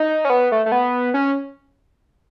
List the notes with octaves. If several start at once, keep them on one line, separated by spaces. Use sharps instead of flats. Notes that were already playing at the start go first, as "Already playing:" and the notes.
Already playing: D#4
C#4
B3
A3
A3
B3
C#4